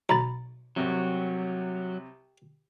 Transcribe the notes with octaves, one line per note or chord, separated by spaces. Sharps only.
B1 A#5 B5 A6
C2 C3 F#3